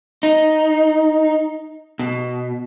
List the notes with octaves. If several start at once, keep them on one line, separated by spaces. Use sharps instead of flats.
D#4
B2